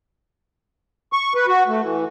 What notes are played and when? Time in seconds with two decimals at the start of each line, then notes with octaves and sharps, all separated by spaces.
1.13 C#6
1.35 B4
1.47 F#4
1.68 A3
1.83 E3